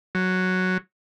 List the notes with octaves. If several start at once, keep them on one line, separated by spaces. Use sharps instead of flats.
F#3